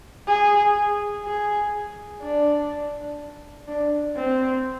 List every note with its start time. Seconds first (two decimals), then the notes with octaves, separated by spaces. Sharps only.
0.28 G#4
1.25 G#4
2.22 D4
3.68 D4
4.16 C4